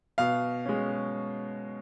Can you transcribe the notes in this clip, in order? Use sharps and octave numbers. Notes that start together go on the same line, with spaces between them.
B2 F5
G#3 C#4